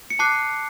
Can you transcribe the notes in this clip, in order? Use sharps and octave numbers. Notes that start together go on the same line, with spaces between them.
C#7
A5 D6 F#6 C7